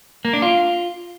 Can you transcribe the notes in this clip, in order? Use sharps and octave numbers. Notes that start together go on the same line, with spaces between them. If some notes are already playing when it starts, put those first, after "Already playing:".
A#3
D4
F4